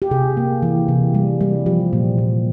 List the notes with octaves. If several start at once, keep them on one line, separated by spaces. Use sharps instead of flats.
G4
C3 G#4
A#3
E3
C3
G3
G3
F3 G4
A#2
A#2